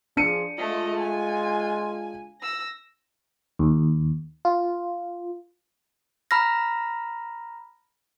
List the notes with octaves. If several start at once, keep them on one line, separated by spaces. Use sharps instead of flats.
F3 D4 G#4 C#7 D#7
G#3 A3 F4 D#5
G#5
E6 A#6
D#2
F4
A#5 B5 F6 A#6